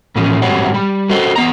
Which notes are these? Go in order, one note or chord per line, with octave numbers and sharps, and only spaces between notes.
A2 E3 F3 C#4 D#4
G#2 F#3 G3 C4 C#5 F#5
G3
F#4 A4 C5 D#5
E2 B3 A#5